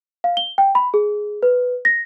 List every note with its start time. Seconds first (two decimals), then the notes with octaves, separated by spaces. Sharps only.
0.24 F5
0.37 G7
0.58 G5
0.75 B5
0.94 G#4
1.43 B4
1.85 A#6